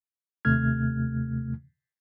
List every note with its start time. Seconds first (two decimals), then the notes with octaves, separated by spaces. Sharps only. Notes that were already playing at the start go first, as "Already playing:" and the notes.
0.45 D#2 C3 A3 F6 G#6